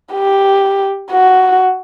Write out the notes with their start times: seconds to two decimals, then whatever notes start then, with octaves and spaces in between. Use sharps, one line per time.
0.14 G4
1.12 F#4